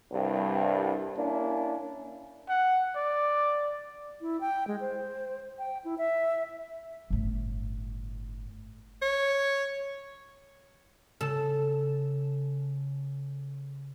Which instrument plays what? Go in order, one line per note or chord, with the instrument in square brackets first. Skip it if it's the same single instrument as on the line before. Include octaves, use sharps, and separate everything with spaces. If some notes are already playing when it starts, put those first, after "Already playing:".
[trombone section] C2 G2
A#3 C#4 D4 E4
[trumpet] F#5
D5
[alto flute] E4
G5
G#3
C5
G5
E4
E5
[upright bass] G1 A2
[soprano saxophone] C#5
[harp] C#3 [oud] A4